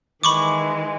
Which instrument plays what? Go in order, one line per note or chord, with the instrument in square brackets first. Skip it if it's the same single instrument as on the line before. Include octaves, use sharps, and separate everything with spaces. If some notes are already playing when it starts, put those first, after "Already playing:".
[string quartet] D#3 E3 G#3 [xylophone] B5 C#6 D6